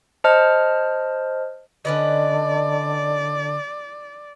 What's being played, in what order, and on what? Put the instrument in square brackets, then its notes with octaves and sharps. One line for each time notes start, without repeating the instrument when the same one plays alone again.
[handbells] C5 D#5 A5 F6
[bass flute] D3 [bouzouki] C#4 B4 D#5 [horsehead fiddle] D5